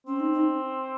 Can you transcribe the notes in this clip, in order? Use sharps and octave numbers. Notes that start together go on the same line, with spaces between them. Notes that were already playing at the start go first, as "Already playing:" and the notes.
C4 C#4
D#4
D#4